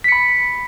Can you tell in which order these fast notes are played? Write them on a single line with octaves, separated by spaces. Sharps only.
B6 C#7 B5